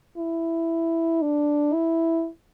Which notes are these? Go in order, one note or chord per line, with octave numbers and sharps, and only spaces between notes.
E4
D4
E4